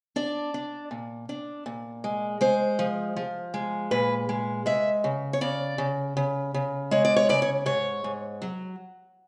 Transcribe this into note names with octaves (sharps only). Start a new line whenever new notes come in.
D4 D5
D4
A#2
D4
A#2
G#3
G#3 C5
F3
F3
G#3
A#2 B4
G#3
G#3 E5
C#3
C#5
C#3 D5
C#3
C#3
C#3
G#3 C#5
D5
C#5
C#3 D5
C#5
G#2 C#5
G#2
F#3